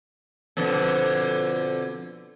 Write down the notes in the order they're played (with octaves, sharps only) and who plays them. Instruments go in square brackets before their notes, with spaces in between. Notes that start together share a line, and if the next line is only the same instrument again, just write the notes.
[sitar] F2 B2 D3